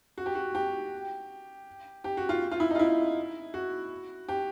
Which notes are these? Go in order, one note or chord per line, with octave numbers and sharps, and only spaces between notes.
F#4
G4
F#4
G4
G4
F#4
F4
F4
E4
D#4
F4
E4
F#4
G4